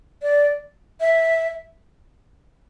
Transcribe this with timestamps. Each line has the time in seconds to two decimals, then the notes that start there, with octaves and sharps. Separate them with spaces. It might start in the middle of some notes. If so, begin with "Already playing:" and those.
0.22 D5
1.00 E5